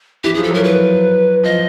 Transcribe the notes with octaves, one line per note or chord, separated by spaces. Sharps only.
E3 G4
F3 G#4
A4
F#3 A#4
B4
F3 D#5